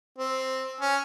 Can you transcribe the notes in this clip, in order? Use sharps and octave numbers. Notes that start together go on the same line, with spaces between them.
C4
C#4